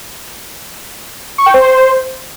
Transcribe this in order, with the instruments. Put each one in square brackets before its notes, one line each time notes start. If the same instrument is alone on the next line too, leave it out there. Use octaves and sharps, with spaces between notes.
[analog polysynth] C#6
G5
C5